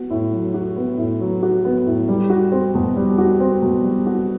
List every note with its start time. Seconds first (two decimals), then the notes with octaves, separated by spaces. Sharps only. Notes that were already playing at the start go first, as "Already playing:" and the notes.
Already playing: B3 F#4
0.10 A2
0.33 F#3
0.54 F#4
0.76 B3
0.98 A2
1.20 F#3
1.43 F#4
1.65 B3
1.86 A2
2.08 G3
2.30 F#4
2.52 C4
2.75 B2
2.96 G3
3.18 F#4
3.40 C4
3.62 B2
3.84 G3
4.06 F#4